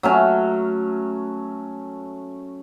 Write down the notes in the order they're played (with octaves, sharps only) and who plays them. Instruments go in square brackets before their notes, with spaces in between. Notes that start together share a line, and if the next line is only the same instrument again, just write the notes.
[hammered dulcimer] F#3 A3 C#4